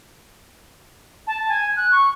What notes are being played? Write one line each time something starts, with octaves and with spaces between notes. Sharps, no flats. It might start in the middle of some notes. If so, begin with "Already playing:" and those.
A5
G#5
F#6
C#6